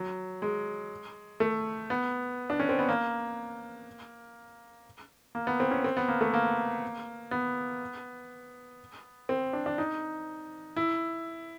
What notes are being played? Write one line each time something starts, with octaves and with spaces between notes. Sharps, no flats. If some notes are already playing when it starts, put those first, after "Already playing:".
Already playing: F#3
G#3
A3
B3
D4
C#4
C4
B3
A#3
A#3
B3
C4
C#4
C4
B3
A#3
A3
A#3
B3
C4
D4
D4
D#4
E4